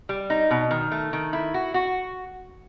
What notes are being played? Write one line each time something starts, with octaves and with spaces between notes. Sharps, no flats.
G3
D#4
B2
D#3
A3
D#3
E4
F#4
F#4